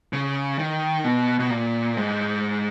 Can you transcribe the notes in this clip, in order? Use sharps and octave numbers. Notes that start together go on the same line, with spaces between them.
C#3
D#3
B2
B2
A#2
G#2